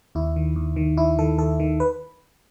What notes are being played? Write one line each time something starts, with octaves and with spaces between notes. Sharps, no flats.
D#2 E4
D#3
D#2
D#3
D#2 E4
D#3 A4
D#2 A4
D#3
B4